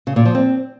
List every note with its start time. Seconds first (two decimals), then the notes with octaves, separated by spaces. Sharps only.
0.07 C#3
0.16 A#2
0.25 F3
0.35 C4